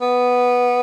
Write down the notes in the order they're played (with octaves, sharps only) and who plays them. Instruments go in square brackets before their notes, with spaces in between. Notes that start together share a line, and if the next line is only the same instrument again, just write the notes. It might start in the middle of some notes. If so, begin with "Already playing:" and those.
[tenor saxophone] B3